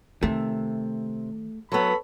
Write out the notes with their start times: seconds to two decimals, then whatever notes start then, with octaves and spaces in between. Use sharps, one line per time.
0.23 C3 D#3 A3
1.72 F#3 B3 A4 C#5 B5